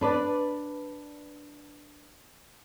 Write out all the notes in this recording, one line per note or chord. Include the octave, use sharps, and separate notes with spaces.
D4 B4 D5